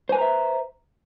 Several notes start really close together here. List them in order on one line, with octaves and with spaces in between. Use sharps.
C5 G#5 B4 A#5 E5